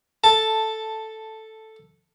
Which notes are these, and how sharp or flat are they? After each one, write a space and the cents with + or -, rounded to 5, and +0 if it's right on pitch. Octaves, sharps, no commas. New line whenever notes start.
A4 +0 A5 +5